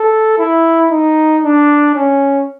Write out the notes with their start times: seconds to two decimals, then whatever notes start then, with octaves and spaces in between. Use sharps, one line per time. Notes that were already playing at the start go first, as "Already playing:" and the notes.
Already playing: A4
0.38 E4
0.91 D#4
1.44 D4
1.95 C#4